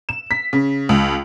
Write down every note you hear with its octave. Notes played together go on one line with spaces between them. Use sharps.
E7
B6
C#3
C#2